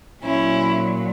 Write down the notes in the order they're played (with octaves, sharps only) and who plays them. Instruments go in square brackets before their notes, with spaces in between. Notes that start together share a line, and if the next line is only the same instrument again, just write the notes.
[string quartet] A#2 F#3 C#4 E4